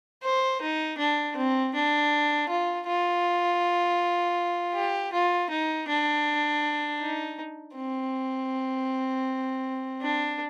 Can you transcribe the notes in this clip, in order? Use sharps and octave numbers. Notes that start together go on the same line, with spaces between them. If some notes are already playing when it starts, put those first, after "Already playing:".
C5
D#4
D4
C4
D4
F4
F4
G4
F4
D#4
D4
D#4
C4
D4